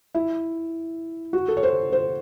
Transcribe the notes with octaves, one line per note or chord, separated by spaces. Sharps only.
E4
F#4
A4
C#5
C5
C5